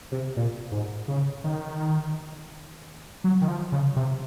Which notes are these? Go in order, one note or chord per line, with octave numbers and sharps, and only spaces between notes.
C3
A#2
G#2
C#3
D#3
F#3
D#3
F3
C#3
C3